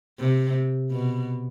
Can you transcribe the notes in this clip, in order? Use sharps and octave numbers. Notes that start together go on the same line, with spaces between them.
C3
B2